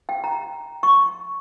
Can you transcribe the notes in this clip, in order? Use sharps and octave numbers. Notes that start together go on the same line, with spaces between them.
G5
A#5
C#6